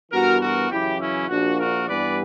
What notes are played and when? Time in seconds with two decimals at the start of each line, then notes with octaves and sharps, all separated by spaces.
0.12 G2 E3 B3 F#4 A#4
0.40 F#4 A#4
0.70 F#2 C#3 E3 E4 G4
1.00 C#4 E4
1.28 A#1 A#2 A#3 D4 F#4
1.58 F#4 A#4
1.87 G2 E3 G3 B3 B4 D5